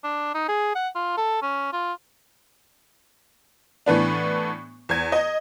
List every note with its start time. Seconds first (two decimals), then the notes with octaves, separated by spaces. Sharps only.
0.04 D4
0.34 D#4
0.49 G#4
0.75 F#5
0.95 F4
1.17 A4
1.42 C#4
1.73 F4
3.86 A2 E3 B3 D4
4.89 E2 G#6
5.12 D#5